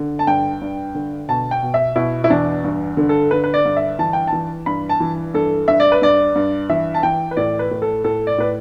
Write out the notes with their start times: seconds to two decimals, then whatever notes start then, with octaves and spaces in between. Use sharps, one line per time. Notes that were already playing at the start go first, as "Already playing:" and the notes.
Already playing: D3
0.19 A5
0.27 G2 G5
0.61 G2
0.95 D3
1.29 B2 A5
1.51 G5
1.62 B2
1.74 E5
1.96 B2 E4
2.24 E4
2.30 E2 D4
2.64 G2
2.97 D3
3.09 A4
3.31 D3 B4
3.44 B4
3.54 D5
3.65 G2
3.76 E5
3.99 E3 A5
4.13 G5
4.27 A5
4.32 E3
4.66 G2 B5
4.89 A5
5.00 E3
5.34 G2 A4
5.68 G2 E5
5.80 D5
5.92 B4
6.02 G2 D5
6.35 G2
6.69 E3 E5
6.94 A5
7.03 E3 G5
7.31 B4
7.37 A2 D5
7.59 B4
7.71 A2
7.82 A4
8.04 A2 A4
8.27 D5
8.38 A2 B4